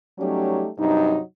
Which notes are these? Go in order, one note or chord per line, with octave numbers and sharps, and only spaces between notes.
F#3 G3 A3 C#4 D#4 G4
G2 C3 F#3 D#4